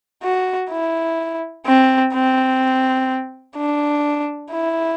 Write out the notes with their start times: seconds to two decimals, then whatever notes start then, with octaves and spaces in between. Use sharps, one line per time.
0.23 F#4
0.70 E4
1.66 C4
2.14 C4
3.56 D4
4.52 E4